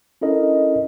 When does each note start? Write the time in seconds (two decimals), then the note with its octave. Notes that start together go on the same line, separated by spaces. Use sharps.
0.21 C#4 D4 E4 A4 A#4 D#5